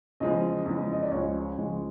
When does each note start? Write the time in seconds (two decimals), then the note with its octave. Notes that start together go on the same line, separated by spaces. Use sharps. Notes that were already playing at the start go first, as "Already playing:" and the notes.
0.20 E2 C#3 F3 G#3 D#5
0.66 E2 C#3 F3 G#3
0.93 D#5
1.02 D5
1.11 C#2 C#3 F3 G#3 C#5
1.57 C#2 C#3 F3 G#3